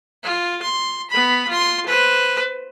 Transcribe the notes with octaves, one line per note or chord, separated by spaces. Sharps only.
F4
C6
B3 B5
F4 C6
B4 C5